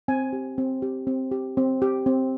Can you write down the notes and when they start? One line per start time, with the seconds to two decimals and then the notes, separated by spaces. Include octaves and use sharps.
0.08 C4 G#5
0.33 G4
0.58 C4
0.82 G4
1.07 C4
1.32 G4
1.57 C4
1.82 G4
2.06 C4